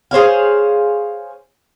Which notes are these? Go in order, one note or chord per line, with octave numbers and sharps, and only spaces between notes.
G#4 C5 C#5 F5